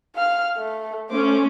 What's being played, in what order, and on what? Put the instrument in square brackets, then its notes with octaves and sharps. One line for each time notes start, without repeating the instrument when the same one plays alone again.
[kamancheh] F5 F6
A3
[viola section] A3 C#4 [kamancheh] C5 D6